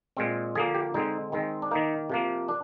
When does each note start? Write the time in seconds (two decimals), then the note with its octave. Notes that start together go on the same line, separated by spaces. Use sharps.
0.17 A#2 G#3 C4
0.55 D3 F3 A#3 G#4
0.75 G4
0.94 D3 G#3 C4 D#4
1.32 D#3 G#3 C4
1.62 D4
1.71 D#3 A#3 D#4
2.10 C3 F3 A#3
2.48 D4